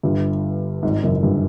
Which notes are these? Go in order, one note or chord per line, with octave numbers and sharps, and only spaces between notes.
G1 G2
G#1 G#2
F#1 F#2
G1 G2